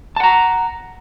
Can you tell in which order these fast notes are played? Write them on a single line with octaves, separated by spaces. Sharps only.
A5 F#5 A#5